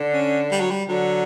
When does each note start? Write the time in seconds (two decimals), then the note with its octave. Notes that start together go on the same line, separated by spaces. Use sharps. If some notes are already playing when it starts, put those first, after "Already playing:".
Already playing: D3
0.13 C#4
0.52 G3
0.60 F#3
0.71 G3
0.88 D3 F#3